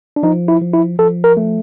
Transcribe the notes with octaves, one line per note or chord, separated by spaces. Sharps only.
D4
F3 D#4
E4
F3
E4
F3 A4
A#4
A3